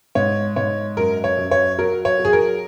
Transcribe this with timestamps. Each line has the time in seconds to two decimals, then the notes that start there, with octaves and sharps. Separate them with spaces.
0.15 G#2 C#5
0.56 G#2 C#5
0.97 F#2 A#4
1.24 C#5
1.37 F#2
1.51 C#5
1.78 F#3 A#4
2.05 C#5
2.19 F#3
2.25 G#4
2.33 A#4